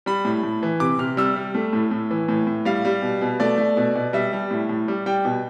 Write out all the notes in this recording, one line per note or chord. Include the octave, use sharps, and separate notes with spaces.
G3 B5
A2
A2
E3
C3 D6
C3 F6
G3 E6
G3
A3
A2
A2
E3
A2
A2
G3 F5
G3
B2
B2
A3 D5
A3
B2
B2
G3 E5
G3
A2
A2
G3
G3 G5
B2